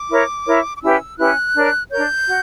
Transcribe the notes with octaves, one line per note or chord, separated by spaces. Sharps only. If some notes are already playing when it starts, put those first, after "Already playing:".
Already playing: D6
E4 A#4 C#5
E4 A#4 C#5
D6
C#4 E4 G4 B4 E6
C#4 E4 G4 B4 F#6
D4 A#4 C#5
D4 A#4 C#5 G6
F#4